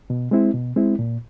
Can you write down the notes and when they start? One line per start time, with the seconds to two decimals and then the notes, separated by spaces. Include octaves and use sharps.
0.10 B2
0.31 G#3 C4 E4
0.54 B2
0.76 G#3 C4 E4
0.99 A#2